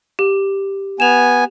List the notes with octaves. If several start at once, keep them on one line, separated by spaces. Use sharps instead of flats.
G4
B3 G#5 E7 F7